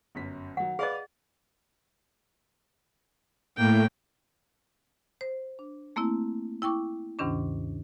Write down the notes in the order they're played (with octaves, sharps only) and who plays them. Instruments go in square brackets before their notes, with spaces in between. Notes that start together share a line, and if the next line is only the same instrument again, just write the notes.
[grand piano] G1 F#2 B6
[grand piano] D#3 F#3 [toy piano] F#5
[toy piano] G#4 D#5 [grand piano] B4 D5 F5
[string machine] A2 [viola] A#3 G5
[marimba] C5
D4
A3 A#3 C4 E4
E4 G5 C#6 D6
D2 G2 C3 D#3 C#4 D4